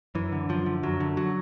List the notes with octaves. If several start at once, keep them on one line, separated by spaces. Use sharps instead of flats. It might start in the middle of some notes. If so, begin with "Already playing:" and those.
F#2 E3
D3
F#2 F3
D3
F#2 F#3
D3
F#3